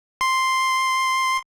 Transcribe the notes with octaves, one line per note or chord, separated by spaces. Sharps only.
C6